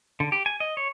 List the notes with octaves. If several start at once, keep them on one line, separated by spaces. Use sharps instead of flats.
D3
G4
G#5
D#5
C#5